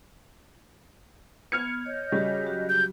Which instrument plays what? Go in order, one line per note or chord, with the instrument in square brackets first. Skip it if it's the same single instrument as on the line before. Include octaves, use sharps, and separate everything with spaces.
[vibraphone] B3 [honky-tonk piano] F6 G#6 C#7
[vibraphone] C#5 [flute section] D#5 G6
[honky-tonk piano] C#3 G3 [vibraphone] F#4 C#5
[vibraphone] F#3 F#4 G4
[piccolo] G6